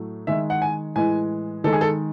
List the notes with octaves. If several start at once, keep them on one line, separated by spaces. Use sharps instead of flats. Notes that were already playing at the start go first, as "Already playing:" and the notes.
Already playing: A2 F#3 A3
D#3 G#3 E5
F#5
G#5
A2 E3 G#3 G#5
D#3 G#3 A4
G#4
A4